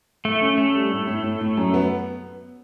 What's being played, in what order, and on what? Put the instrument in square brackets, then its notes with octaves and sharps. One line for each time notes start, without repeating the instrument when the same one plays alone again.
[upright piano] A2 [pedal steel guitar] A3
[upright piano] C#4
[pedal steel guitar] A3 [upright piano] C#4
[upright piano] G3
A2
A2
A2
A2
F#2
B3